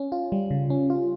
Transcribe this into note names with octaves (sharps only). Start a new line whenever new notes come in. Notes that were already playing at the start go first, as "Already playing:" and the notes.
Already playing: C#4
F4
G3
C#3
C#4
F4